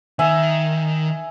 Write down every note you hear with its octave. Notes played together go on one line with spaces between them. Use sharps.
D#3 E5 G#5